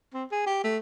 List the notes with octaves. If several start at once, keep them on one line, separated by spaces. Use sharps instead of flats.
C4
G#4
G4
A3